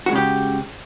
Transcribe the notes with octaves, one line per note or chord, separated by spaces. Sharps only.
C#3 G#3 F#4 G4